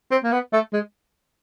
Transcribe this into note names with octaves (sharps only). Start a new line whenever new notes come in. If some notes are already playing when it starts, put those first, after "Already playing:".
C4
A#3
B3
A3
G#3